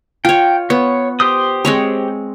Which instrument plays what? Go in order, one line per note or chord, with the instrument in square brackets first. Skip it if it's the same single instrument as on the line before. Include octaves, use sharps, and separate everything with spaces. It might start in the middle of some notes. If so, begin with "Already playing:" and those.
[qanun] F4 C#5 [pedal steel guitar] G5
[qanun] B3 [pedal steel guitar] C#5
[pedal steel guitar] G4 C5 D#6
[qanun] G#3 C4 C#5